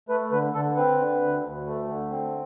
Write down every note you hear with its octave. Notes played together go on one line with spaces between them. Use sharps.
A3 B4
D3 B4
D3 A4
C4 B4
D3
D2
D2
A3
D3
C4